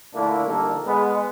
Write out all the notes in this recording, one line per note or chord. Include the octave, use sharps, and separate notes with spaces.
A#2 D3 A3 A#3 D4 E4
A#1 D3 D#3 G3 A#3 A4
G#3 B3